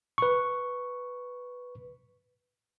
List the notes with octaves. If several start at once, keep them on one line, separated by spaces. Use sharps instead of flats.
B4 C#6